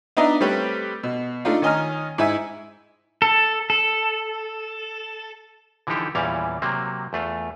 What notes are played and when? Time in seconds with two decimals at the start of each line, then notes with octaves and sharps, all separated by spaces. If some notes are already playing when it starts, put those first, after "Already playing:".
0.17 B3 D4 D#4 D#5 E5 A#5
0.41 G3 A3 C4 G4 B4 C#5
1.03 B2
1.45 A3 D4 D#4 F4
1.62 D#3 C#4 D#5 G#5 A#5 F6
2.18 G#2 E4 E5 G#5 E6
3.22 A4
3.70 A4
5.87 D3 E3 F3 D#4 G4 A4
6.15 E2 A#2 E3 G3 C#4 F5
6.62 C3 F#3 A#3 C4
7.13 E2 A3 F4